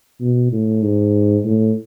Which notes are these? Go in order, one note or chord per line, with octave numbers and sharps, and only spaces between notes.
B2
A2
G#2
A2